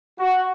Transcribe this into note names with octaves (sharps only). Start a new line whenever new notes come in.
F#4